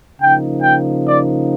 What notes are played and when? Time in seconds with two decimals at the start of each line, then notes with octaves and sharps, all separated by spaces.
0.21 C#3 F3 A#3 D#4 G5
0.63 G5
1.06 D5